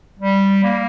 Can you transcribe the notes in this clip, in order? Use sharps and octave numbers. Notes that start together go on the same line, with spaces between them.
G3
A#3